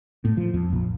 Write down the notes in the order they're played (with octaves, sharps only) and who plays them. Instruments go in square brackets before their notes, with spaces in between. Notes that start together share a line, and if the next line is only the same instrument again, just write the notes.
[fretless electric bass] A2
F3
F2
A#1